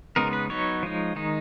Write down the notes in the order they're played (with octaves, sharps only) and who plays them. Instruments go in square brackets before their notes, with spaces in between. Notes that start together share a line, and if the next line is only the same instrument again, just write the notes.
[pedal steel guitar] C#3 G#3 B3 D#4 A#4
B4
F#3 B3 D#4 C#5
F3 G#3 D#4
D#3 G#3 D#4